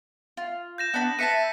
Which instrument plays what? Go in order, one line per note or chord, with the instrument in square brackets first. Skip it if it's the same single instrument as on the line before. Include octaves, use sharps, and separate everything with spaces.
[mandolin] F4
[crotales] G6 A#6 E7
[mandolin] B3 D4 B5
[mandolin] B4 E5 A5 [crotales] B6 C#7 D#7